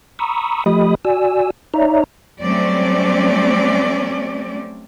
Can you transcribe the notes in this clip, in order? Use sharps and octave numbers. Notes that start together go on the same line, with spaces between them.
A#5 B5 C#6 D#6 E6
F3 A3 G4 D#5 B5 D#6
F#4 D5 G#5 E6
D#4 C#5 D5 E5 A#5
F#3 G3 A3 C4 C#4 D5